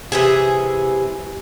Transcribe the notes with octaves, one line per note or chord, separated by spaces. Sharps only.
C3 E3 G#4